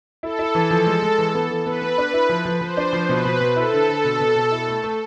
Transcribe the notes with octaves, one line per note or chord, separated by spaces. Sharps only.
E4 A4
E4
E3
F3
G#3
G#3
E3
B3
E3
B3 B4
B3
D4
E4
F3
F3
F3 C5
D4
F3
B2 B4
B2
B2
E4 A4
D3
D3
B2
B2
B2
E4
A3
A3